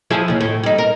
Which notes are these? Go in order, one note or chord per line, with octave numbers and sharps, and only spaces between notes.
F3 E4 G#4
D#2 C#3
A2
G3 D#4
A#4